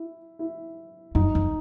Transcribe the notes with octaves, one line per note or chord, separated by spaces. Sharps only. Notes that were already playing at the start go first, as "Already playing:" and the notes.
Already playing: E4
E4
F#2 D#4
F2